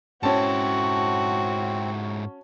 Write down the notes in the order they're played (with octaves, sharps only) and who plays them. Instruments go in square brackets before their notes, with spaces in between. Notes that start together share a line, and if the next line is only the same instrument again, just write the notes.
[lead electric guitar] G#2 E4 [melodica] C4 [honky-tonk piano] C#4 A5 [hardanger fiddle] F#4